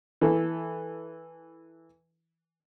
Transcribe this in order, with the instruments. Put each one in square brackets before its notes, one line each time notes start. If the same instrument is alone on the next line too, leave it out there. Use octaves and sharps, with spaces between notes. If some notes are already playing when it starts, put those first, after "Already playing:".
[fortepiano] E3 E4 A4